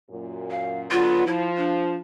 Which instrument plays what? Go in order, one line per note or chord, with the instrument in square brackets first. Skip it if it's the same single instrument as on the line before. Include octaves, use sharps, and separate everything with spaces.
[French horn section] F#2 A#2
[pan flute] F5
[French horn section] D3 F#3 B3 [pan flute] F4
[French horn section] F3 [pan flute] E4
[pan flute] D4